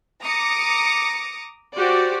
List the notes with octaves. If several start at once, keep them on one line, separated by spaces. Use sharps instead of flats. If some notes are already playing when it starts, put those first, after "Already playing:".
A#5 D6 D#6 A#6 C#7
F#4 G4 C5 D5